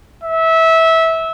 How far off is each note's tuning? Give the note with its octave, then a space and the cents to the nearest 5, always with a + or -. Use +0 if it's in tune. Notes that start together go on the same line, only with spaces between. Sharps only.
E5 -20